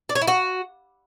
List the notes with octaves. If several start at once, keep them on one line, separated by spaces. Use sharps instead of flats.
D5
C#5
E4
F#4